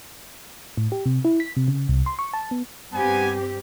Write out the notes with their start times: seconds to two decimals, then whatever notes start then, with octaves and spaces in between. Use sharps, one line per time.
0.77 A2
0.92 G4
1.06 C3
1.25 E4
1.40 B6
1.57 C3
1.68 C#3
1.89 C2
2.06 C6
2.19 C#6
2.34 A5
2.51 B3
2.94 G2 B3 C4 G4 G#5